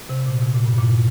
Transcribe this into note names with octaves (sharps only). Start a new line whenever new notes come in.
C3
A#2
C3
A#2
G2
A#2
A#2